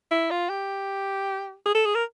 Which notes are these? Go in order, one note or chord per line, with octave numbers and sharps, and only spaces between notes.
E4
F4
G4
G#4
A4
G#4
A#4